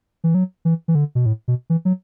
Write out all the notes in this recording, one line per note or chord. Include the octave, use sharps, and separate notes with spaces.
E3
F#3
E3
E3
D3
B2
A2
B2
E3
F#3